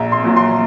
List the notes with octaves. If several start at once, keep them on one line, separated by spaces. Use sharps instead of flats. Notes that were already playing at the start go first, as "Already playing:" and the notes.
Already playing: A#1 A#5
C6
A#2 F#3
C6